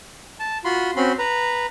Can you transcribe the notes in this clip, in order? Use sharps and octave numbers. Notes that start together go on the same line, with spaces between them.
A5
F4 F#4 B5 C6
C4 C#4 F#4 B5 C6
B4 A#5